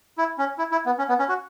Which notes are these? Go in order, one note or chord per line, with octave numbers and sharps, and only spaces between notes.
E4
C#4
E4
E4
B3
C#4
B3
C#4
F#4